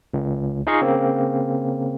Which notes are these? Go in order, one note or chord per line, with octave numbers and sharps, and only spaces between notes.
C#2
D#4 F4 G#4 D#5 F5 C#6
C#3 A#3 C4